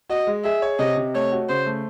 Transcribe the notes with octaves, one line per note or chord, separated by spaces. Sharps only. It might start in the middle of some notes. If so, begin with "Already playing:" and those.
F#4 D#5
G#3
G#4 E5
C#5
C3 D#5
C3
A3 C#5
F#4
C#3 C5
A3